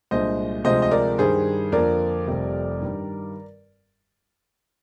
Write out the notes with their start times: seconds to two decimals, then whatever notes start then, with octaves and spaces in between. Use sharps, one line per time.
0.11 C2 A#2 G#3 D4 C5 D#5
0.64 D2 C3 F3 G#3 C5 D#5
0.82 D#5
0.91 A#4 D5
1.18 G2 D#3 G3 G#4 C5
1.72 F2 D3 F3 A#3 A#4 D5
2.27 F1 F2 C3 G3
2.80 G2 D#3 G3